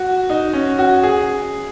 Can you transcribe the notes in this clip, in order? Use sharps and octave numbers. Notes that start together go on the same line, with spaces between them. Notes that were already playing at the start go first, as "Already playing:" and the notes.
Already playing: F#4
D#4
C#4
F#4
G#4